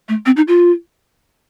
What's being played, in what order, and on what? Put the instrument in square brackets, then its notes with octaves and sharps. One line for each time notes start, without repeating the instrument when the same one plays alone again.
[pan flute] A3
C4
D#4
F4